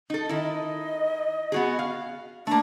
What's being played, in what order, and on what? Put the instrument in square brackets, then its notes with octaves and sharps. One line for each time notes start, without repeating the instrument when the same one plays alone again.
[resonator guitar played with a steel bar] D#4 A4
[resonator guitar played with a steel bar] D#3 E4 [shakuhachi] D#5
[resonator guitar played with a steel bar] B3 F#4 G#4
F5
[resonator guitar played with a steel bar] A3 A#3 [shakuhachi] D4